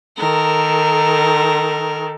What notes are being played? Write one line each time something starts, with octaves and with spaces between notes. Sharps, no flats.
D#3 A4 A#4